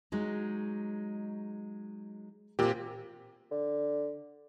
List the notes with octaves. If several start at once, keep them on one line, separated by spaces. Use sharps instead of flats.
F#3 G#3 D#4
A#2 A#3 C4 G4
D3